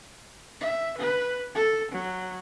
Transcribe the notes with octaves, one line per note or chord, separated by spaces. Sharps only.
E5
B4
A4
F#3